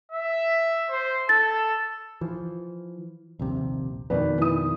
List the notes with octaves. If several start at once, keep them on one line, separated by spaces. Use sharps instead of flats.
E5
C5
A4 A6
E3 F3
A#1 D#2 C3
F2 B2 D#3 B4 D5
E3 D#6